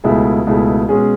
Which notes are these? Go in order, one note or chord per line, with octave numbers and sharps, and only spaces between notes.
C#2 B2 A3 E4 G#4
C#2 B2 A3 E4 G#4
B2 G#3 C#4 G#4